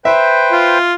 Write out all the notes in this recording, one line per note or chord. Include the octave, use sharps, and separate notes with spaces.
B4 C5 E5 G5
F4